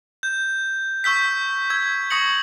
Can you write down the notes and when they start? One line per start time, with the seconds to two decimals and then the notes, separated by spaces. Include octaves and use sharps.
0.23 G6
1.04 C#6 E6 G6 B6
1.70 E6 G#6
2.10 C#6 D#6 A#6 C#7 F#7